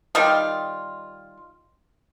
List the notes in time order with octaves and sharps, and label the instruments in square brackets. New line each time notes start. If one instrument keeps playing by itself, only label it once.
[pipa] D#3 G3 F4